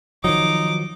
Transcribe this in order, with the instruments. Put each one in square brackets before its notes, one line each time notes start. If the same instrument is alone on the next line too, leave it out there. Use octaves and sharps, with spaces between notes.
[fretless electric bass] D#3 F3 F#3 [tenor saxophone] D#4 [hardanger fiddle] D6